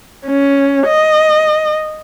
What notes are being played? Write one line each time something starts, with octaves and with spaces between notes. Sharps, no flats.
C#4
D#5